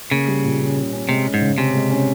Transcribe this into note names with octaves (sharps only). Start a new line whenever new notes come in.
C#3 A#3
G3
A#2
C#4
C#4
C#4
C3 G#3
C#4
G#2
C#3
C3 C#4
G#3
C#4